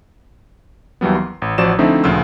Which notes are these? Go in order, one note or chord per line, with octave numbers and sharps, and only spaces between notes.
D#2 E3 F#3 G3 B3
C6
A1
A1 F3 F#4 C5 D5 E7
D3 F3 A3 C4 D#4 E4
D2 A#2 C#3 F3 F4 E6